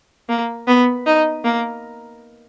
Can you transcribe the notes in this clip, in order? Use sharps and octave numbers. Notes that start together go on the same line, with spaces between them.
A#3
B3
D#4
A#3